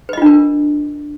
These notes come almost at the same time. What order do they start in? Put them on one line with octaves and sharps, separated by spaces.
B4 D#5 F4 D4 A#4